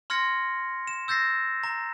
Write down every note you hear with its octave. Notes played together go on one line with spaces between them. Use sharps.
C6 F6 G#6 A#6 C#7
E7
E6 G6 A6 A#6 C7
A#5